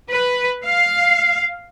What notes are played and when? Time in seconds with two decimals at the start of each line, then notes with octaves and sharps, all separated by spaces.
0.10 B4
0.65 F5